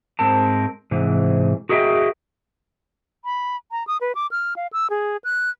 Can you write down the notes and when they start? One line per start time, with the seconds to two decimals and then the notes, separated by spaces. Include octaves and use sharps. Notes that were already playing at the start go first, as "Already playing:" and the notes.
0.19 G#2 C4 A#4 A5
0.91 G#2 C3 E3
1.69 F#4 G#4 A#4 D#5 E5 G5
3.25 B5
3.71 A#5
3.87 D#6
4.01 B4
4.15 D6
4.31 F6
4.56 F5
4.73 E6
4.90 G#4
5.24 F#6